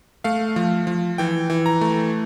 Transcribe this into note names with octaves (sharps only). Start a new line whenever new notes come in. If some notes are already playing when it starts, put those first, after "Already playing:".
A3 F5
F3
F3
E3 G5
E3
A#5
A3